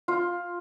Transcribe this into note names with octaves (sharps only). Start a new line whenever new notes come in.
F4